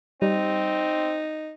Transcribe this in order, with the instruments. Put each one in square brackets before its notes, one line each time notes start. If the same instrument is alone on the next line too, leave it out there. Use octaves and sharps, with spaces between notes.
[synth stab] G3 [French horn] C4 [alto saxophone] D#4